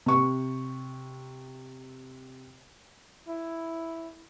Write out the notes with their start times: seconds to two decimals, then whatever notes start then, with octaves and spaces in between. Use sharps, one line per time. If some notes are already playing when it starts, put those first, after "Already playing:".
0.06 C3 C#6
3.28 E4